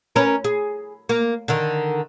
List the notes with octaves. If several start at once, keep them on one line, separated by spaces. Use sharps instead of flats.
C#4 A#4 B4
G#4
A#3
D3 D#3